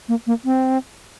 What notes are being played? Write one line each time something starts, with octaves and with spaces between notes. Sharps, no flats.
A#3
A#3
C4